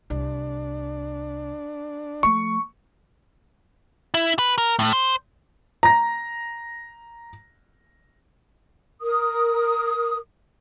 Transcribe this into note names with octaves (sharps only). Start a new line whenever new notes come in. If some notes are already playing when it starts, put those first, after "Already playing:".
C2 D4
F3 A3 C#6
E4
B4
A#4
A2
C5
A#5 A#6
A#4 D#6